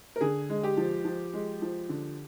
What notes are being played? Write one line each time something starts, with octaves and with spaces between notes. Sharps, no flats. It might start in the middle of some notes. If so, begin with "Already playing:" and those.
A#4
D3 G#4
G#3
G4
F3
F3
G#3
F3
D3